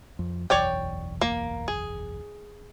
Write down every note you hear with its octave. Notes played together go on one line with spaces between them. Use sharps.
F2
F#1 B1 E2 C#5 D5 G5
A#3
G#4